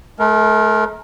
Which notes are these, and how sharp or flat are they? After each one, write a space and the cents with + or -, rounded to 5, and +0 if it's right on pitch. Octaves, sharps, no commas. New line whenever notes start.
A3 -40 A#4 +0